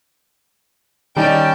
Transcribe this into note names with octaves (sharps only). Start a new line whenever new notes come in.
D#3 G3 C#4 D#4 D5 G5 A5